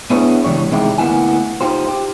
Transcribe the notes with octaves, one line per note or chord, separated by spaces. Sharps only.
B3 D4 E4 G#4 B4 C#5
C#2 G2 E3 G3 C#5
C3 D#3 G#3 D#4 E4 G4
D2 A#3 B3 E4 G#5
D#4 F4 G4 C5
G4